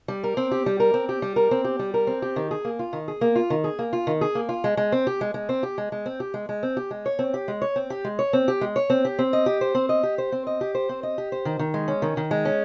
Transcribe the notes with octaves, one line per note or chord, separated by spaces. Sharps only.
G3
A#4
C4
G4
G3
A#4
C4
G4
G3
A#4
C4
G4
G3
A#4
C4
G4
D#3
G#4
A#3
F4
D#3
G#4
A#3
F4
D#3
G#4
A#3
F4
D#3
G#4
A#3
F4
G#3
G#3
C4
G4
G#3
G#3
C4
G4
G#3
G#3
C4
G4
G#3
G#3
C4
G4
G#3
C#5
C4
G4
G#3
C#5
C4
G4
G#3
C#5
C4
G4
G#3
C#5
C4
G4
C4
D#5
G4
C5
C4
D#5
G4
C5
C4
D#5
G4
C5
C4
D#5
G4
C5
D#3
D#3
G#3
C#4
D#3
D#3
G#3
C#4